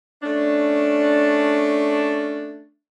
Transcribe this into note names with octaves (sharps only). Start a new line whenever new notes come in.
A3 C#4 D4